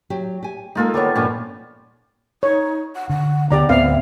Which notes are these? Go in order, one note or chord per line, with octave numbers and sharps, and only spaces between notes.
F#3 G4
G4 G#5
G#3 A#3 D#4 F4 A4 G#5
D#3 G3 B3 A#4 C#5
G2 A#2 F3 G3 C#4
D#4 C#5
F#5
D3 F#5
D2 D3 B3 G4 D5 A#5
D2 A2 B3 C4 E5 F5